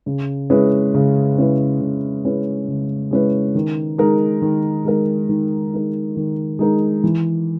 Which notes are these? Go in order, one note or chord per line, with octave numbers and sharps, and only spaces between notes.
C#3
G#3 C#4 E4 B4
C#3
G#3 C#4 E4 B4
C#3
G#3 C#4 E4 B4
C#3
G#3 C#4 E4 B4
D#3
G#3 D#4 A#4
D#3
G#3 D#4 A#4
D#3
G#3 D#4 A#4
D#3
G#3 D#4 A#4
E3